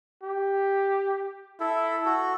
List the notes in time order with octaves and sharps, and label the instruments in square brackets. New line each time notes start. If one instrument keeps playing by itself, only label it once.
[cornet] G4
[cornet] E4 [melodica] A4
[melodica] F#4 A4